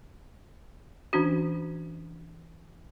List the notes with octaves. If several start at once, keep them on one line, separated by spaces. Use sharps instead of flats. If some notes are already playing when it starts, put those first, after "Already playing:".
E3 C#4 D4 F#4